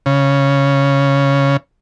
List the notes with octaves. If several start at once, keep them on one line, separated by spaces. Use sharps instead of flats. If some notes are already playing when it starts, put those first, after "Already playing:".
C#3